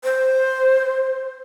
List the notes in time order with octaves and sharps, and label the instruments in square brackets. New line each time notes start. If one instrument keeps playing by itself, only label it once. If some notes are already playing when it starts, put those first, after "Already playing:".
[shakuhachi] C5